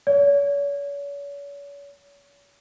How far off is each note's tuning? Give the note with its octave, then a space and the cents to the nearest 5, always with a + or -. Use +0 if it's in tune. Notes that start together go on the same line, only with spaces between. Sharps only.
C#5 +40